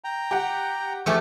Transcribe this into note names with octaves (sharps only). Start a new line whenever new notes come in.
G5 A#5
G4 F#5
F3 A3 G4 G#4 C#6 E6